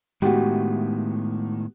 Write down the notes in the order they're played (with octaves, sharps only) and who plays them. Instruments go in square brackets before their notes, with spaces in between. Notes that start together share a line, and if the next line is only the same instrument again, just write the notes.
[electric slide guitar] A2 D#3 [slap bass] G#3 B3 [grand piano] F#4 G4